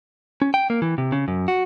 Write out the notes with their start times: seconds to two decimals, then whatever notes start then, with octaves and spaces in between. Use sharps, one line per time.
0.42 C#4
0.54 G5
0.70 A#3
0.82 E3
0.98 C3
1.12 C#3
1.28 F#2
1.48 F#4